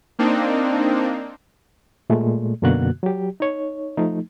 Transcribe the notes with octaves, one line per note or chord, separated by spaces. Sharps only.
A#3 C4 D4 D#4
A#2 G#3 A3
F#2 B2 D3 A#3 F#4 F#6
F#3 G4
D#4 C#5
F3 A3 D#4